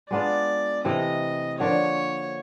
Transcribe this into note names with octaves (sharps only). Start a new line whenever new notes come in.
G#3 B3 D4 F4 D5
C3 E3 A3 D#5
D3 F3 A#3 C#5